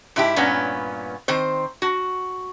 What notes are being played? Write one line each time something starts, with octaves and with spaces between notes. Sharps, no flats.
G#2 E4 G4
G2 A#2 B3 C#4
D#3 C4 C5
F#4